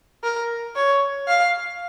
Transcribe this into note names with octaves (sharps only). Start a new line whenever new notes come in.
A#4
C#5
F5